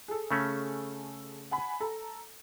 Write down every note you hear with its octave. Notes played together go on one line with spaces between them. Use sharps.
G#4 A4
C#3 A3 C#4
F#5 G#5 B5
A4 A#5